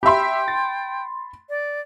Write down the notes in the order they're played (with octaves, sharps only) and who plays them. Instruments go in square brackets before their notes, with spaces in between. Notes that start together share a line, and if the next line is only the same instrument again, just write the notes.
[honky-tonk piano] G4 E5 [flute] G5 [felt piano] B5 C6
[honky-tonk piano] A6
[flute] D5